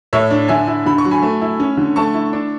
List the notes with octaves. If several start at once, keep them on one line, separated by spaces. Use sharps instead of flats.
A2 C#5 E5
D4
D3 E5 G#5
E4
D3 B5
C#6
F#3
G#5 B5
A3
E4
C#4
D3
A3 A5 C#6
E4
D4